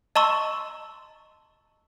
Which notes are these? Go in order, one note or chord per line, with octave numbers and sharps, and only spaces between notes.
D#5 A5 A#5 C6 C#6 E6